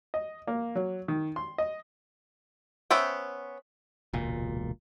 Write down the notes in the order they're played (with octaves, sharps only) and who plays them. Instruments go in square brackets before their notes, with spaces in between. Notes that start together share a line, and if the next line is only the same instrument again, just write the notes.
[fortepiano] D#5
A#3
F#3
D#3
C6
D#5
[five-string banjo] B3 C#4 C5 E5 G5
[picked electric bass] E1 C#2 A#2